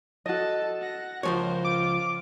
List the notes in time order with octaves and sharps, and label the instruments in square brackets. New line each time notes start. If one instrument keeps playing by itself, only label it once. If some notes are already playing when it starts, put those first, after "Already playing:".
[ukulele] F#4 D#5 [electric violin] A4 A5
[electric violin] F#5 A#6
[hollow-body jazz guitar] C#2 F3 C#5 [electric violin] A#4 C5
[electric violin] F4 [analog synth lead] D6